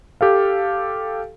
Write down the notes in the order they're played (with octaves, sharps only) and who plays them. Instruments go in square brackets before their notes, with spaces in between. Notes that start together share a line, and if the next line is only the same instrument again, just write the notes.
[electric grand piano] G4 A4 F5